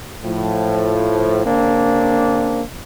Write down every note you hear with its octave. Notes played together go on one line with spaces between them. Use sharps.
A2 F3
C#3 A#3 C4 D4